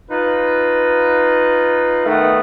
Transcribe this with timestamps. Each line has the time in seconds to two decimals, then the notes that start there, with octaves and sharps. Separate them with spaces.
0.10 D#4 F4 B4
2.05 D#3 A3 B3